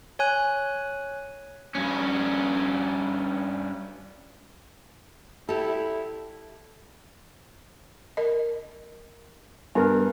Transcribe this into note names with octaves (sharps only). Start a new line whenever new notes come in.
C#5 G#5 F#6
G2 C#4
E4 G4 A4
A#4 D#5
G2 B3 A#4